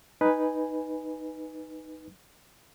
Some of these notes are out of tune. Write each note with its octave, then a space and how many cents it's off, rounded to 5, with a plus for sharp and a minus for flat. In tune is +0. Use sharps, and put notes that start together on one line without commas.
D#4 +0 B4 +0 G#5 +0